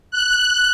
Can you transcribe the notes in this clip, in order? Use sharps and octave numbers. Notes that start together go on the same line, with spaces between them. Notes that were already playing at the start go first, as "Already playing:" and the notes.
F#6